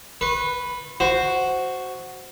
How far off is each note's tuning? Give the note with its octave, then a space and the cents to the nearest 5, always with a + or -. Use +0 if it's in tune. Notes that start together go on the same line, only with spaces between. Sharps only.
B4 +0 C#6 -45
F#4 +0 C5 +0